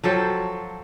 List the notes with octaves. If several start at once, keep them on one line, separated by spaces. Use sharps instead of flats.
F3 F#3 A4 G5